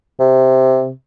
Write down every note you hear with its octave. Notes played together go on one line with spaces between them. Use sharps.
C3